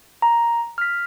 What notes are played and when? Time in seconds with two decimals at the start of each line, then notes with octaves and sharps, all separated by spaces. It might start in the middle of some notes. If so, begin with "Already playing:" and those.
0.22 A#5
0.78 F6 B6